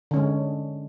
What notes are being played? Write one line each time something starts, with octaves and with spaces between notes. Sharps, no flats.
D3 G#3 C#4